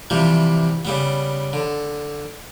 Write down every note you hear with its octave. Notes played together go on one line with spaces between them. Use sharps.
C3 E3 F3 G3
C#3 G3 B3
D3